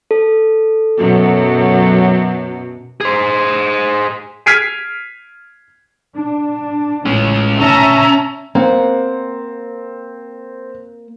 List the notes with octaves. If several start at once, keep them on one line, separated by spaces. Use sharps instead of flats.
A4
F#2 B2 F#3
G#4 C5
F6 G#6 B6 C7 D7 D#7
D4
A1 G#3 C#4
C#4 E5 A5 A#5
A#3 C4 F#5